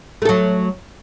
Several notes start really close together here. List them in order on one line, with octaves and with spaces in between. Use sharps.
A3 A4 F#3